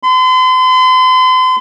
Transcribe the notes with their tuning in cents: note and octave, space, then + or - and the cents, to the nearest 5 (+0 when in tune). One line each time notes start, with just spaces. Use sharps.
C6 -40